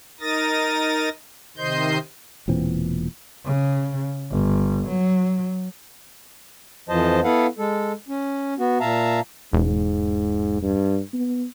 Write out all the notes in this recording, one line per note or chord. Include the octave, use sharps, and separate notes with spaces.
D#4 A#4 D#6 A6 A#6
C3 D#3 C5 D#5 C6 G6
E1 A#2 E3 C4
C#3
G1
F#3
F2 E3 F3 C5 D#5 A5
B3 E4 A4 B4 F5 F#5
G#3 A4
C#4
B3 F#4
A#2 E5 F5 A5 A#5
E1 G#2
G2
B3